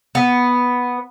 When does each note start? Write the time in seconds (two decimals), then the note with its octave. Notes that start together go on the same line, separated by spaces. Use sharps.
0.15 B3